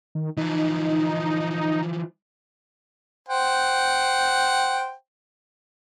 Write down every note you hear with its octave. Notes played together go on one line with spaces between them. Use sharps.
D#3
E3 F3 D#4
C5 F#5 G5